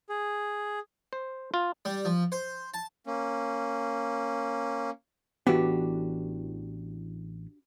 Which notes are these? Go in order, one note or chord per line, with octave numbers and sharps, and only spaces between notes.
G#4
C5
F4
G3
F3
C5
A5
A#3 C#4
A1 E3 B3 D4 F#4 G4